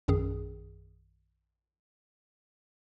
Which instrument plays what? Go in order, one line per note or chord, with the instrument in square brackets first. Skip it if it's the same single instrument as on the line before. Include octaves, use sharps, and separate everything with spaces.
[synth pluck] A#1 F#2 D#3 G#4